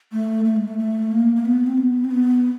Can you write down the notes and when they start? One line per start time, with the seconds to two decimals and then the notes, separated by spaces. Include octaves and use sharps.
0.12 A3
0.45 A3
0.56 G#3
0.68 A3
0.79 A3
1.12 A#3
1.36 A#3
1.45 B3
1.67 C4
1.77 B3
2.05 C4
2.11 B3